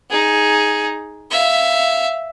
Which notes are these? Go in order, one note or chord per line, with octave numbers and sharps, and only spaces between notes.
D#4 G#4
E5 F5